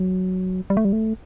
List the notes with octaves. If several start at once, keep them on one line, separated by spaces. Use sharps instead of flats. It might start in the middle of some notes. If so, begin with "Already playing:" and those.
Already playing: F#3
G3
A3
G3
A3